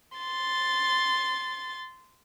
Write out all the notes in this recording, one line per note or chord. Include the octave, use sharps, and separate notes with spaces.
C6 A6